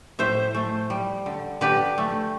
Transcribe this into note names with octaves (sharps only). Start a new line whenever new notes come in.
A2 C5 E5
A3
G3
D3
D3 G4 B4
A3